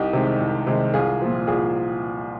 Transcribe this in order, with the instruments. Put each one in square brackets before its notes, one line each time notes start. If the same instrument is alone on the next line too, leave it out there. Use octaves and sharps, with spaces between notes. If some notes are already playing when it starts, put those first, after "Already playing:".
Already playing: [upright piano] C2 D#4 G4
C3 D#3 G#3
C2
C3 D#3 G#3
C2 F4 G#4
A#2 F3
C2 F4 G#4